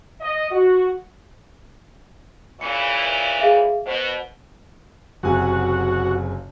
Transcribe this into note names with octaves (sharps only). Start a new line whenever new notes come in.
D#5
F#4
A#2 C#3 E3 C#7
G#4 E5 F5
B2 C5
F#1 C3 F#4 G#5